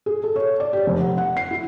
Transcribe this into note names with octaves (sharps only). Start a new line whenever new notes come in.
G#4
A4
C#5
D5
G4
F1
F#5
F#5
C7
E4